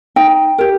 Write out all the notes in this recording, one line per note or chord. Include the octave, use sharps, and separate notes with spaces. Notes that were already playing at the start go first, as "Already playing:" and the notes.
D#4 G5
G4 A#4